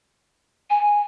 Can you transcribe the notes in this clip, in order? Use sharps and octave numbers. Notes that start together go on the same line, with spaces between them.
G#5